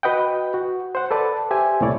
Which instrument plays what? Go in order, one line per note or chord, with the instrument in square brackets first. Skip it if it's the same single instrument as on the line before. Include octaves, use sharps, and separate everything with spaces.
[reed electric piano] F#4 B4 D#5 F#5 G5
F#4
C5 F#5
A4 B4 D5 A5
G4 C5 E5 G#5
C2 A#2 A3 E4 C#5 D5